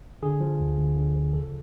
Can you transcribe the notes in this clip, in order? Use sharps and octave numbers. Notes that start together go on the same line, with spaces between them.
D3 G#4
F3
D2
D2
D3
F3
C#3 A4